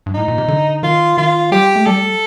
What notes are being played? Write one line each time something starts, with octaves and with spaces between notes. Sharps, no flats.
G2
A2 D#4
A#2
C3
D3
D#3 F4
D#3 F4
G3 G4
A3
G3 A4